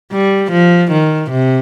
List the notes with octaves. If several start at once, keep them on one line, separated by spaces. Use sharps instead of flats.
G3
F3
D#3
C3